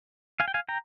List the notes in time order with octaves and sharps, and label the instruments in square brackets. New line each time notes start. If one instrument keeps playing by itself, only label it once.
[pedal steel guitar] F5 G#5
G5
F5 G#5
G5 A#5